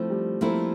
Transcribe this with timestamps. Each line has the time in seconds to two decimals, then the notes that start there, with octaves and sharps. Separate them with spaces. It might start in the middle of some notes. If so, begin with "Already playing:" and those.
Already playing: F3 A3 C4 E4
0.10 G3
0.41 F3 A3 A#3 C4 E4